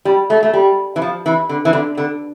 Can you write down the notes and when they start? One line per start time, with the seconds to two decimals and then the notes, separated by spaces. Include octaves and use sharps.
0.05 G3
0.30 A3
0.43 A3
0.53 G3
0.96 E3
1.02 F3
1.26 E3
1.49 D3
1.65 E3
1.73 D3
1.97 D3